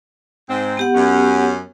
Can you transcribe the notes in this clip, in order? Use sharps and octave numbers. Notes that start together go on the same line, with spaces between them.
G#2 C4
B3 G4 F#5
F#2 C#4